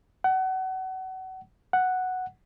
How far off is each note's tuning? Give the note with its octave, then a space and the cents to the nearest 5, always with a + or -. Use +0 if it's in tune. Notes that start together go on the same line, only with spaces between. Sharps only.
F#5 +30
F#5 +0